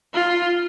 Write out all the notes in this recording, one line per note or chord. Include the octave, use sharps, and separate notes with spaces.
F4